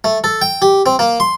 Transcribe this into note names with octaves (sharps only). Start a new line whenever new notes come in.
A3
A4
G5
G4
C4
A#3
C6